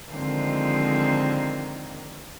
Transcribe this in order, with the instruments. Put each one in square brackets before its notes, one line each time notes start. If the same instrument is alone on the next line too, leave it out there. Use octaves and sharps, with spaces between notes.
[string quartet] D3 D#3 F3 G#3 A#3 C4